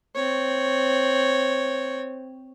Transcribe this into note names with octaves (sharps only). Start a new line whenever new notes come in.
C4 C#5